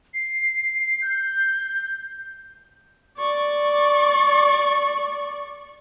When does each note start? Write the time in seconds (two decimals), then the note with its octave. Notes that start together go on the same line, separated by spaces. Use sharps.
0.14 C7
1.02 G6
3.18 D5 C#6